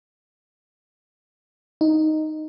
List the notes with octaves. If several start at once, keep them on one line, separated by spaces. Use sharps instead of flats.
D#4